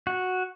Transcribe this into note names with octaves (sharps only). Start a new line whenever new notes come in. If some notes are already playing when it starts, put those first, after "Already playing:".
F#4